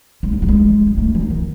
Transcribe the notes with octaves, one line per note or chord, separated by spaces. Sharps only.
G#3
A3
G3
G#3
G#3
A3
E3
D#3